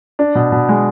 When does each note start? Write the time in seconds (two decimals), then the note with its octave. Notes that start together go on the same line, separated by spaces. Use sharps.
0.19 D4
0.35 B2
0.52 B2
0.69 G#3